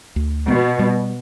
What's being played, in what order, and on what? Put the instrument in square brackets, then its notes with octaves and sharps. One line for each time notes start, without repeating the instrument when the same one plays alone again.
[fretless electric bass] D2
[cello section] B2 [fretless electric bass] B3
[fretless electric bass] G3